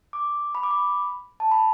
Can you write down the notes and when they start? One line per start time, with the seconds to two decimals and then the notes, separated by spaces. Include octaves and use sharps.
0.13 D6
0.55 B5
0.63 D6
0.71 B5
1.40 A5
1.51 B5